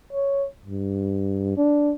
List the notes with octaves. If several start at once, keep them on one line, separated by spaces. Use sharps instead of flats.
C#5
G2
D4